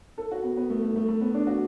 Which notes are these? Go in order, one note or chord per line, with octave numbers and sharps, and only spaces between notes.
A4
F#4
B3
B3
A3
A3
A3
A3
B3
D4
F#4